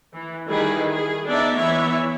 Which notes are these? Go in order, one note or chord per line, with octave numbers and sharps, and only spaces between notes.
E3
D#3 G3 E4 G#4 B4
G#4
B3 D4 D#4 D5 E5
E3 B3 E4 C#5 E5